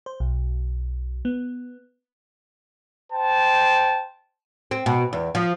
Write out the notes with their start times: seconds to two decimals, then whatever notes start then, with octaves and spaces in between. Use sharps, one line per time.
0.06 C5
0.20 B1
1.25 B3
3.13 C5 G5 A5
4.71 C4
4.86 B2
5.13 E2
5.35 F3